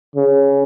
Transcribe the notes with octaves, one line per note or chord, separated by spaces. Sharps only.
C#3